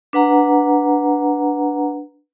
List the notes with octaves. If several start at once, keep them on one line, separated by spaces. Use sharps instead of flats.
D4 B4 F#5 A#5